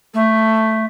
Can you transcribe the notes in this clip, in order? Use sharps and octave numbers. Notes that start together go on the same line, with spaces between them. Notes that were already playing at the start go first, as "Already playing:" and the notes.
A3